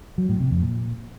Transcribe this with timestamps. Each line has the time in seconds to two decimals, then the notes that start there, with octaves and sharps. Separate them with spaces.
0.18 F#3
0.29 A2
0.40 C3
0.51 F2
0.62 A#2